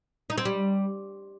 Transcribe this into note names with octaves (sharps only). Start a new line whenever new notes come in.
D#4
C4
G3